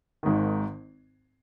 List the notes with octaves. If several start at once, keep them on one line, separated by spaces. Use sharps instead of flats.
G#1 G#2 D#3